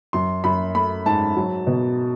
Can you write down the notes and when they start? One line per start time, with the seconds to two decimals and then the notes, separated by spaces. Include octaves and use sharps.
0.13 F#2 C6
0.44 F#2 B5
0.74 A3 B5
1.06 G#2 A5
1.36 F#3
1.67 B2